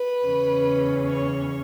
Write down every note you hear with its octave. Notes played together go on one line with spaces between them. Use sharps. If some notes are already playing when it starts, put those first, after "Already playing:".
Already playing: B4
E2 C#3 E3 C#4
C#5